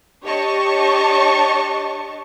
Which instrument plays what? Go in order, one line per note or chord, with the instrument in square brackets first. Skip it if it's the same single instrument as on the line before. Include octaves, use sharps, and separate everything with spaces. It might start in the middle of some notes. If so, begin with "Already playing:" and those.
[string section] D4 G4 C#5 D#5 A5 C#6